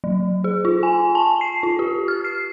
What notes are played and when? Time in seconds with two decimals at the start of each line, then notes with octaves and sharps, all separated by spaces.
0.04 F#3
0.44 G#4
0.65 F4
0.83 G#5
1.15 A5
1.41 C7
1.63 F4
1.79 G4
2.08 F6
2.24 C7